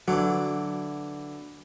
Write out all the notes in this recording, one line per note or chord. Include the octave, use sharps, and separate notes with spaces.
D3 E3 F#3